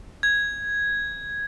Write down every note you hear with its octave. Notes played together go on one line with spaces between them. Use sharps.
G#6